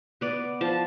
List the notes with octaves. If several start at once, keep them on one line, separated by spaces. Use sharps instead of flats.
B3 D5
F3 A5